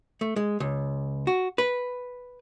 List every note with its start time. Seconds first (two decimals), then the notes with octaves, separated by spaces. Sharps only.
0.21 A3
0.36 G#3
0.60 C#2
1.27 F#4
1.58 B4